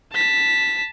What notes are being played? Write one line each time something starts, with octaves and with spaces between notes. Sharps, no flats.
A5 B6